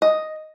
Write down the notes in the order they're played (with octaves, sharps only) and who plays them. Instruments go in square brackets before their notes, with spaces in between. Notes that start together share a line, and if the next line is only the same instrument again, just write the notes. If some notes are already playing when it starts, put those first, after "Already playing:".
[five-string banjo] D#5